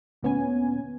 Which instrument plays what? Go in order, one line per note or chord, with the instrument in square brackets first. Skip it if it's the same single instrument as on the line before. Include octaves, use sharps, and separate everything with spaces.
[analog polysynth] D2 A#2 B3 C#4 G#5